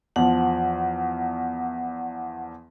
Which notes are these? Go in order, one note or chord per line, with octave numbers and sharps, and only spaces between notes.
E2 F3 F#5